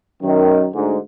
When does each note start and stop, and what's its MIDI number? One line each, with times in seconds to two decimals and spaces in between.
0.22 0.67 42
0.22 0.67 51
0.74 0.96 38
0.74 0.96 44